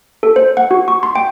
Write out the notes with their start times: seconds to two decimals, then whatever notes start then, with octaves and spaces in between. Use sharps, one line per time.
0.23 A4
0.36 C5
0.57 F#5
0.71 F#4
0.88 C#6
1.03 C6
1.16 G5